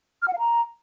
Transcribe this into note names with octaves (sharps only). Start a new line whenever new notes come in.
F6
F#5
F5
A#5